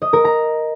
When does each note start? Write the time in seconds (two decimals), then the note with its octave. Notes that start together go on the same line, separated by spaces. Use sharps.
0.02 D#5
0.13 A#4
0.25 A#5